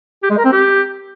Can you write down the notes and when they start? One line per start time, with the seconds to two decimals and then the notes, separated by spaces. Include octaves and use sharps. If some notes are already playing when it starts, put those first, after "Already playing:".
0.23 G4
0.30 G#3
0.38 A#4
0.45 C4
0.52 G4